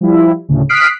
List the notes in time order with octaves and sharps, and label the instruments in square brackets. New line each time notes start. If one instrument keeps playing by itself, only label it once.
[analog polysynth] F3 G3 E4
D2 A2 C#3
D#6 F6 F#6 B6 C7 D7